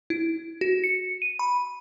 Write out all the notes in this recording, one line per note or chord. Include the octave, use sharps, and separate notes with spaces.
E4
F#4
C#7
D#7
B5